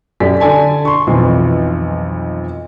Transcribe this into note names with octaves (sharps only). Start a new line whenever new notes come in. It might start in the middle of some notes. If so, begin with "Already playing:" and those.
F#2 G4 A4 D5 B6
D3 A4 D5 G#5 A5
C6 C#6
B1 F2 E3